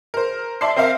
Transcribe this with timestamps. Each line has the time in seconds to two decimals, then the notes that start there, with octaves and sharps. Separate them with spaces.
0.14 A#4 C5
0.61 D5 E5 A5 C6 C7
0.76 C4 A#4 C5 E5 F5